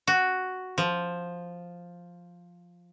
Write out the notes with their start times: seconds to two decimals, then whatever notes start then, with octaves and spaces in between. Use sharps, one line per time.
0.07 F#4
0.78 F3